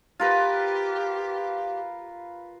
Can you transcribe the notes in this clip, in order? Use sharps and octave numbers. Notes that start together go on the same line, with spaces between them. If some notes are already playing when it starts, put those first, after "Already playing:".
F4 G4 A#4 B4